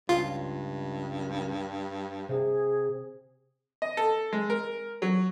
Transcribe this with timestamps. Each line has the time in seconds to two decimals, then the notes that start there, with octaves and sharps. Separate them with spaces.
0.09 C#2 G2 F4
2.29 C3 G#4
3.82 D#5
3.97 A4
4.33 G#3
4.50 A#4
5.02 F#3